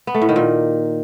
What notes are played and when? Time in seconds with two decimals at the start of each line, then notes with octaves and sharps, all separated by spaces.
0.07 B3
0.14 A3
0.22 A2
0.29 D#3
0.36 A#2